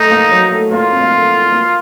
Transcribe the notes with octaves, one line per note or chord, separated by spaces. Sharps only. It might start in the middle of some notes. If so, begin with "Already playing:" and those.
Already playing: A3 D#4
A#3
F#3
A3
A#3 F4
C4
A#3
A3
A#3